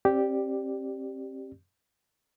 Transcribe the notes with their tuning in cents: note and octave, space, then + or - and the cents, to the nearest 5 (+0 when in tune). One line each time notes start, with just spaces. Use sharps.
C4 +40 G4 +0 D5 +10